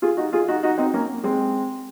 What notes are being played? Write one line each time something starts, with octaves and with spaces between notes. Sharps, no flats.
F4 G#4
D#4 F#4
F4 G#4
D#4 F#4
D#4 F#4
C4 D#4
A#3 C#4
G#3 C4